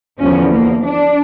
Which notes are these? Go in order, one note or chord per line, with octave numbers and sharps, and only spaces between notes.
E2 D3 F3 C#4
A#3
D4